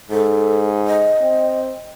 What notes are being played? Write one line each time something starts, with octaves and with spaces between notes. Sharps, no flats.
G#2 A4
D#5
C4